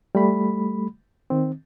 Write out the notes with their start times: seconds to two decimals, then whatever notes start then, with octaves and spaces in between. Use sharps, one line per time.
0.15 G3 A3 B5
1.30 D#3 C4